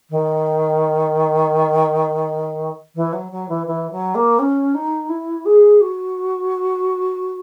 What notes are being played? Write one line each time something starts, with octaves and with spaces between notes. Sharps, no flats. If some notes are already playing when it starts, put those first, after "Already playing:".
D#3
E3
F#3
F#3
E3
E3
F#3
A#3
C#4
D#4
E4
G#4
F#4